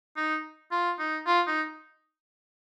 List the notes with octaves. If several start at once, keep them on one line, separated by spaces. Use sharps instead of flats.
D#4
F4
D#4
F4
D#4